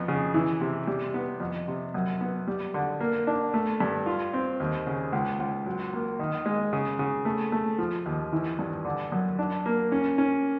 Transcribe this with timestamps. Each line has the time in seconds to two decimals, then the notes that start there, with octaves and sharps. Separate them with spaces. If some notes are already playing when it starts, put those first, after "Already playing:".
Already playing: F2 B3
0.08 C#3
0.34 E3
0.61 C3
0.87 G3
1.14 B3
1.40 F2
1.68 C3
1.94 F#2
2.21 B3
2.48 G3
2.74 D3
3.00 A#3
3.27 D4
3.54 A3
3.80 G2
4.06 F4
4.34 C4
4.60 D#2
4.87 C#3
5.12 C#2
5.39 C#2
5.66 F#3
5.93 A#3
6.19 D#3
6.46 G#3
6.73 C#3
6.99 C#3
7.25 A3
7.52 A3
7.78 F3
8.06 D#2
8.32 E3
8.59 G2
8.85 D3
9.12 F#2
9.39 D4
9.66 A#3
9.92 C#4
10.18 C#4